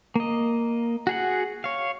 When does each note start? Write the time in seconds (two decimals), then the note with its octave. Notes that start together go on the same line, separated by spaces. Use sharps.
0.15 A#3 D#5
1.07 F#4 G#4 F#5
1.64 C#5 F5